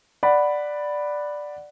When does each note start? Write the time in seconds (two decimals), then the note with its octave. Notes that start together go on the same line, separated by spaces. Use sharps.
0.23 D5 F#5 B5